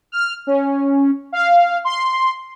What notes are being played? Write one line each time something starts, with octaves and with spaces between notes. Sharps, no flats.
F6
C#4
F5
C6